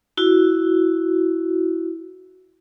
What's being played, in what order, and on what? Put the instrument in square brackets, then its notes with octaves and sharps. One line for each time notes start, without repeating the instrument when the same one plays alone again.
[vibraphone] E4 F#4